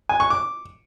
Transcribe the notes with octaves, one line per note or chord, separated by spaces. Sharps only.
G#5
C#6
D6